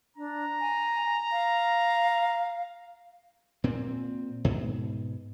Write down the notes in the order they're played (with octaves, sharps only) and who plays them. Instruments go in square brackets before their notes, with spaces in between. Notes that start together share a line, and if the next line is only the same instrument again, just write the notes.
[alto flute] D4 [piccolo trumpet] A#5
[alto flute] G#5
F5
[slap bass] A#2 C4
G#2 B2